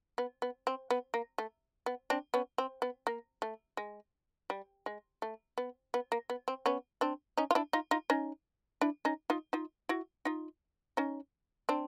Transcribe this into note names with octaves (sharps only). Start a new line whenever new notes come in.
B3
B3
C4
B3
A#3
A3
B3
C4 D4
B3 C#4
C4
B3
A#3
A3
G#3
G3
G#3
A3
B3
B3
A#3
B3
C4
B3 C#4
C4 D4
C#4 D#4
F4
D4 E4
D#4 F4
D#4 F4
C#4 D#4
D4 E4
C#4 D#4
D#4 F4
D#4 F4
E4 F#4
D#4 F4
C#4 D#4
C4 D4